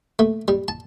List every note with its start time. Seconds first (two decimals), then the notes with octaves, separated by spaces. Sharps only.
0.19 A3
0.48 G3
0.68 A5